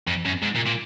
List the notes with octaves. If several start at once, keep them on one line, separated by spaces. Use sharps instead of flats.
F2
F#2
G#2
A#2
A#2